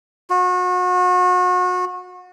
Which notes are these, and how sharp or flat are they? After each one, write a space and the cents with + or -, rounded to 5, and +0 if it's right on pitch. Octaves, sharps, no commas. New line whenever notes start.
F#4 -35